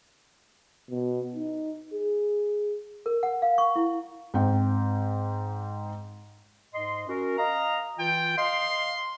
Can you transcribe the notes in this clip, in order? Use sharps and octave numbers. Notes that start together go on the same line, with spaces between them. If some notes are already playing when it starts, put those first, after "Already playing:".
B2
D#4
G#4
A#4
F#5
F5
C#6
E4
G#2 C4 G5
G#2 D#5 C6
C#4 F#4 A#4
D#5 F5 A#5
E3 F4 G5
D#5 F5 C6